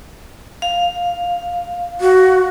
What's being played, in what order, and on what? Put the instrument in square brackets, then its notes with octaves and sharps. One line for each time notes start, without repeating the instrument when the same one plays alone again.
[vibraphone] F5
[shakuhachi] F#4